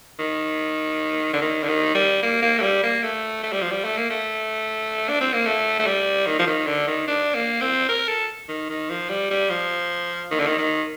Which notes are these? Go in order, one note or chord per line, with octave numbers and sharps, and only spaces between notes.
D#3
D3
D#3
D3
D#3
G3
A#3
A#3
A3
G3
A#3
A3
A3
G3
F3
G3
A3
A#3
A3
D4
C4
A#3
A3
A3
G3
D#3
F3
D#3
D3
D#3
D4
A#3
C4
A#4
A4
D#3
D#3
F3
G3
G3
F3
D#3
D3
D#3
D#3